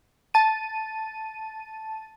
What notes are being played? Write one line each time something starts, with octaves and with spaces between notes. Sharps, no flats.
A5 D#7